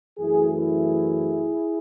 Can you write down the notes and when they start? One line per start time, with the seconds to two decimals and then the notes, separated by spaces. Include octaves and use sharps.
0.19 F#2 E3 A3 E4 G#4
0.53 E4 G#4